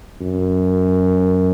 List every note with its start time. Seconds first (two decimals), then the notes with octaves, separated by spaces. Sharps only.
0.21 F#2